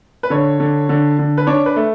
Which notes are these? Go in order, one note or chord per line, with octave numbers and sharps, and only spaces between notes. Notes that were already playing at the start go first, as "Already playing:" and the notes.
B4
D3 C#5
D3
D3
D3
B4
D4 C#5
B4
A3